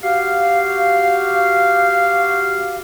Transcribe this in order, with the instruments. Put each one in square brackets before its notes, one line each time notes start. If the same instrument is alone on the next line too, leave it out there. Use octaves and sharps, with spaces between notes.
[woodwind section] F#4 G4 F5